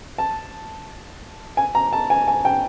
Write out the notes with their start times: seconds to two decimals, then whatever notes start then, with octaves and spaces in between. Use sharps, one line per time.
0.18 A5
1.57 G#5
1.75 A#5
1.93 A5
2.10 G#5
2.28 G#5
2.45 G5